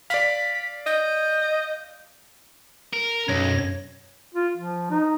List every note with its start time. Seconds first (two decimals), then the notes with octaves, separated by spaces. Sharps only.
0.10 D5 F5 B6
0.86 D#5 G6
2.93 A#4
3.29 B1 F#2 C#5 A#6
4.35 F4
4.57 F3
4.91 D#4